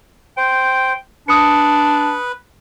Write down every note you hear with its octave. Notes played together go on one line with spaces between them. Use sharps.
C5 G5
D4 B4 D#6 C#7